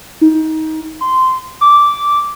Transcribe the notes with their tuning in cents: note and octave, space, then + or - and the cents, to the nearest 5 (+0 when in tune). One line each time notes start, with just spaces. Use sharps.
D#4 +20
C6 -15
D6 -10